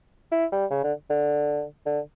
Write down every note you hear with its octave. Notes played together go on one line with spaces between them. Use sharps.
E4
G3
C#3
D3
D3
D3